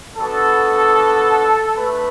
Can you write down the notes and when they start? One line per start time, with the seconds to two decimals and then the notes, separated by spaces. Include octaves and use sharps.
0.17 B3 D4 F#4 A4
1.76 A3 D4 B4